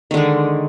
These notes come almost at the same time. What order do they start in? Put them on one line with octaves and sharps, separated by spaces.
D#3 D3 G#3